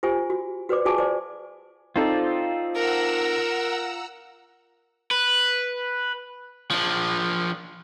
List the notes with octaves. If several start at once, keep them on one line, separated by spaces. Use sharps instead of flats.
F4 G4 C5 G#5
F#4
F#4 B4 C5 D5 D6
F4 F#4 G#4 G#5 A5 D6
C5 D5
C4 D#4 F4 A4 C5 D5
A#4 F#5 A#5 E6
B4
F3 D4